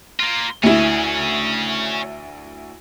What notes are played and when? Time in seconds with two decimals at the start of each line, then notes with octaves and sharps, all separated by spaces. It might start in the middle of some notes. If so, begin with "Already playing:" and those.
0.20 A#3 F4
0.63 D2 C#4 E4 G#4